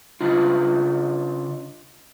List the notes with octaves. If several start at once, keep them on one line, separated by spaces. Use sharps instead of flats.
C#3 D4 F4